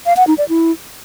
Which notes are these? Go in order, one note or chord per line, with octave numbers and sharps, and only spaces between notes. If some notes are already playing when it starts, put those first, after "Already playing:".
F5
F#5
D#4
D5
E4